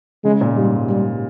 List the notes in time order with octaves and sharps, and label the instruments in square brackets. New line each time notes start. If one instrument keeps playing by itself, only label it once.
[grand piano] C#3 [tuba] G#3
[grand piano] A#2
[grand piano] G#2 [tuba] G3
[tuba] G3